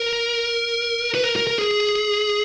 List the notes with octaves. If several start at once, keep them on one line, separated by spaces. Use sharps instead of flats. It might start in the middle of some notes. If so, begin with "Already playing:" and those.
Already playing: A#4
B4
A#4
A#4
A#4
G#4